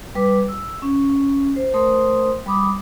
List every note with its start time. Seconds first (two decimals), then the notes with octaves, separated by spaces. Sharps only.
0.15 G3 B4 D6
0.48 E6
0.82 C#4
1.56 C5
1.74 A3 A#4 C5 C6 D#6
2.46 G3 B5 D6 D#6